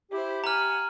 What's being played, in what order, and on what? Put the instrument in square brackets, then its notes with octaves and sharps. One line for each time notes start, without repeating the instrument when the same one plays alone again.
[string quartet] E4 C5 [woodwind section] G4
[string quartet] F#5 G#5 [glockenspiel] A#5 F6